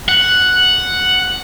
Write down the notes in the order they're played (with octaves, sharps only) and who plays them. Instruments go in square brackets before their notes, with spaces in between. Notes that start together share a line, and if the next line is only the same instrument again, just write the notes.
[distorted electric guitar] F#5